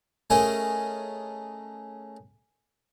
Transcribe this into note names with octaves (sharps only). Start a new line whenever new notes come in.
A3 C#4 G#4 A#4 D#5